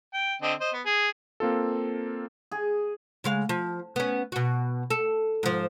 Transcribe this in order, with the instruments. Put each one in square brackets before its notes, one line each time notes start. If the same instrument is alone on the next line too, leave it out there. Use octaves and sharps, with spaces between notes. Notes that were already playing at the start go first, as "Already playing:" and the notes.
[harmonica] G5
D3 C4 D#5
C5 D#5
B3
G#4
[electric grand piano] A#3 C4 F4 A4
[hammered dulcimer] G#4
[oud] C#3 G#3 F5
F3
B3 C#4
B2 F#4
A4
G#2 F3